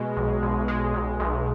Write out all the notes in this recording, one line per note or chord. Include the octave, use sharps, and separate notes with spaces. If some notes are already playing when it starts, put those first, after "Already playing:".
Already playing: B2 G#3
B1
B1
G#3
B1
B1